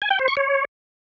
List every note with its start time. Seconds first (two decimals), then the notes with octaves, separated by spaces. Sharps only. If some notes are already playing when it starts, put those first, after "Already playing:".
0.02 G#5
0.10 G5
0.19 C5
0.28 C#6
0.37 C#5